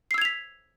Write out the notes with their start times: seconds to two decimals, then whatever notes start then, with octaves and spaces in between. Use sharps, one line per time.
0.11 C7
0.14 E6
0.18 G#6
0.22 F7
0.25 B6